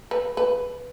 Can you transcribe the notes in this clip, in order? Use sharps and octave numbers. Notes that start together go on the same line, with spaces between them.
B4
B4